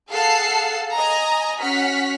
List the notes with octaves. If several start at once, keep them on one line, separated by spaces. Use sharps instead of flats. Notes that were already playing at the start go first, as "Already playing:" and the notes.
G#4 A4 F5 F#5 A5 C7
D#5 G#5 A#5
C#4 F#4 F#5 F6 B6